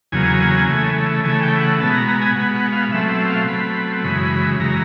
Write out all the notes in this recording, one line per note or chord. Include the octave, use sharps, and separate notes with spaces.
E2 C#3 F#3 A#3 G#5
C#3 E3 A3
C#3 E3 A3 G#5
G5
F#5
B2 G#3 B3 A5
A#5
A#5
G#5
B2 G#3 B3 F#5
F#5
F5
B2 F#3 A3 C4 E5
E5
F5
B2 F#3 A3 C4 B5
F#2 C#3 E3 G#3 B5
F#2 C#3 E3 G#3 A#5